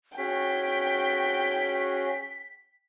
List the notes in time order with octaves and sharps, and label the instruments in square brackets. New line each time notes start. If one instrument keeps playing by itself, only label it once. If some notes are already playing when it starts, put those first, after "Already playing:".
[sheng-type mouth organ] C#4 F#4 G#4 [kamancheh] G5 [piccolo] B6